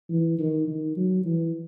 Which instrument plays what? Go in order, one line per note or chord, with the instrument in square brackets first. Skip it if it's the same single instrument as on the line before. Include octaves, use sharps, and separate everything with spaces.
[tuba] E3
D#3
D#3
F#3
E3